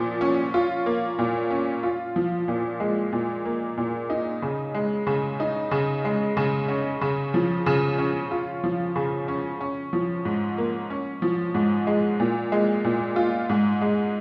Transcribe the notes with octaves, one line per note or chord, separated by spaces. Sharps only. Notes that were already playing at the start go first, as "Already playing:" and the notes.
Already playing: A#2 F3
C#4
F4
A#3
A#2
C#4
F4
F3
A#2
G#3
A#2
A#3
A#2
D#4
C#3
G#3
C#3
D#4
C#3
G#3
C#3
C#4
C#3
F3
C#3
C#4
F4
F3
C#3
C#4
C#4
F3
G#2
A#3
C#4
F3
G#2
G#3
A#2
G#3
A#2
F4
G#2
G#3